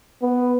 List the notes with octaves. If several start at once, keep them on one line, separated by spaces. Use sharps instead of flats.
B3